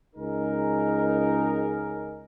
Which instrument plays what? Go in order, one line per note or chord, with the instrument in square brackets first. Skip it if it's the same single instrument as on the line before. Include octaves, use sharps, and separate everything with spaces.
[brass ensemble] C#2 D#4 G#4 A#4